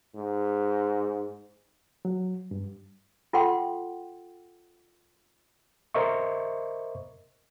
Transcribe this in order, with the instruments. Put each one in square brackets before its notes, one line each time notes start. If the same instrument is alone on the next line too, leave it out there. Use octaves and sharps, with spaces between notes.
[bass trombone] G#2
[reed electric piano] F#3
G2
[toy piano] F4 A4 F#5 G5 C6
[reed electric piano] A#4 C5 D#5 E5 C#6